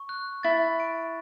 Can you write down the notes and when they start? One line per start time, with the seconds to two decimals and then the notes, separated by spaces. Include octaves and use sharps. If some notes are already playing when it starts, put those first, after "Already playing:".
Already playing: C#6
0.09 F#6
0.43 E4 A6
0.80 D7